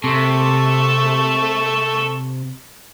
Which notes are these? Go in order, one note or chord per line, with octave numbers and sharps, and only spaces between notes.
C3 A4 A5 C#6